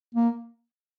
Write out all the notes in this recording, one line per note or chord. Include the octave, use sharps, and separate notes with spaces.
A#3